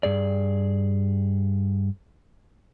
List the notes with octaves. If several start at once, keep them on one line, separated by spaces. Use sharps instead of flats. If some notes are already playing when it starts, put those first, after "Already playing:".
G2 G#4 D5